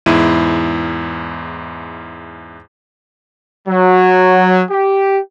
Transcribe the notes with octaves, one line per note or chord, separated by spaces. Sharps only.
E2 G#2 E4 D#7
F#3
G4